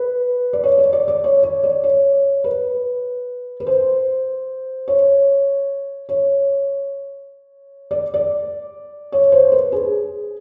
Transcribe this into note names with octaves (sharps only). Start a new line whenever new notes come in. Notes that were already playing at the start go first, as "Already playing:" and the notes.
Already playing: B4
D5
C#5
D5
D5
D5
C#5
C#5
D5
C#5
B4
B4
C5
C#5
C#5
D5
D5
C#5
C5
B4
G#4